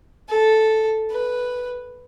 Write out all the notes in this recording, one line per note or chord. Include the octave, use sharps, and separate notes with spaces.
A4
B4